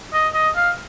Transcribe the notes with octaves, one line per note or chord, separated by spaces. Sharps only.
D#5
D#5
F5